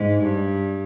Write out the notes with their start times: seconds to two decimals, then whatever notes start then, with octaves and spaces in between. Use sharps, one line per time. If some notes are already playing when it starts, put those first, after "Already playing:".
Already playing: G#2
0.23 G2